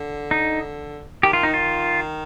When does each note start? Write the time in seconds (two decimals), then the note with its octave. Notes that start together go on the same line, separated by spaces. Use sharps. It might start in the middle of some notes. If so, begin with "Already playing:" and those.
Already playing: D3
0.31 D#4
1.23 D#3 G4
1.33 F4
1.43 D#4
1.54 F4